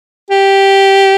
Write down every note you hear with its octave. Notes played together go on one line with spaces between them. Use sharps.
G4